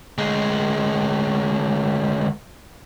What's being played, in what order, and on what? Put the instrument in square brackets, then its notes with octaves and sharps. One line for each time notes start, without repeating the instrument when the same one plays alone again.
[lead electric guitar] D2 G#3